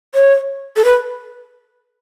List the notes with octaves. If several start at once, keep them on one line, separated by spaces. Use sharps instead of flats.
C#5
A4
B4